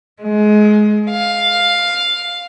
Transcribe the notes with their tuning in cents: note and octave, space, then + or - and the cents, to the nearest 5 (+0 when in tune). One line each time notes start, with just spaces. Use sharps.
G#3 +25
F5 +5